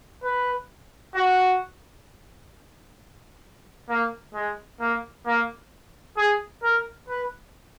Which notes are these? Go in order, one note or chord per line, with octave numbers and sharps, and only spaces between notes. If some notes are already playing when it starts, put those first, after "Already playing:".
B4
F#4
A#3
G#3
A#3
A#3
G#4
A#4
B4